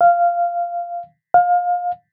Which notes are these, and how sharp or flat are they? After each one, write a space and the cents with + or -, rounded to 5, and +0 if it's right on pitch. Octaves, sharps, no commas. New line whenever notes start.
F5 -10
F5 +25